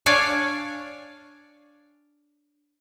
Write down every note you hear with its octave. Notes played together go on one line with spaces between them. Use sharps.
D4 C#5 D5 F5 G#5